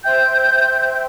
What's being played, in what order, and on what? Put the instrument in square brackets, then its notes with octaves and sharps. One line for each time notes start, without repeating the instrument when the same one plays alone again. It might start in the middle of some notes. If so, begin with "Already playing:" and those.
[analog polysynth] C5 E5 G5 [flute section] G6